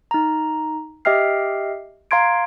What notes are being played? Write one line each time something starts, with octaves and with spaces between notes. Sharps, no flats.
D#4 A#5
G4 D#5 E5 G5 F6 C7
F5 A#5 C6 G#6 D7